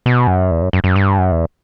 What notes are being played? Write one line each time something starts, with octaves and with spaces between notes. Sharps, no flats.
B2
F#2
E2
F#2
F#2
F#2
G2
F#2
E2